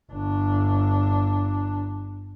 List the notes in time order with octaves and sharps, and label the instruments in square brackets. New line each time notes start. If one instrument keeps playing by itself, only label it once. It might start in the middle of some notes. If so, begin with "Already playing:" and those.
[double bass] G1 D4